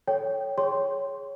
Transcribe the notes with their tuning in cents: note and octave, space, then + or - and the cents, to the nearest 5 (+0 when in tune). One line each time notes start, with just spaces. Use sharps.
A4 +0 C#5 +0 G5 +0
G#4 +0 C#5 +0 C6 +0